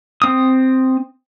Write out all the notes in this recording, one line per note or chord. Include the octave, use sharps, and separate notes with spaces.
C4 D#6